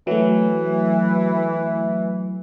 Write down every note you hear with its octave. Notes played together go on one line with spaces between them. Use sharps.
E3 F#3 A3